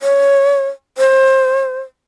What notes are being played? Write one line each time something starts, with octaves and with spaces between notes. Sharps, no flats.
C#5
C5